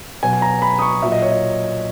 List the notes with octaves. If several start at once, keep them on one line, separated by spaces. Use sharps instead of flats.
B2 F#3 G#5
G#5
A#5
B5
D#6
C#6
A#2 F#3 E5
D#5
C#5
D#5